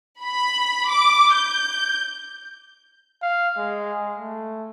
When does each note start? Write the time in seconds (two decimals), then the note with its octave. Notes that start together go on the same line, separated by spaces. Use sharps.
0.22 B5
0.90 D6
1.33 G6
3.22 F5
3.58 G#3
4.18 A3